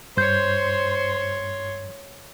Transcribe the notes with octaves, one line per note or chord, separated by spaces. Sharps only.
G2 C5 C#5 C6 G6